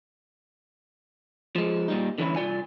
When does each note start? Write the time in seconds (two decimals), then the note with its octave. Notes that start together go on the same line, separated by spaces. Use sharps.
1.56 F3 G#3
1.88 A#2 G3 D#4
2.18 D3 E3 C#4 E4
2.36 C2 F4 D5 G#5